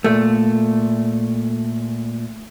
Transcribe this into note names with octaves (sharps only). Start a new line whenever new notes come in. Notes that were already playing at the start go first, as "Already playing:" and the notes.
A#2 A3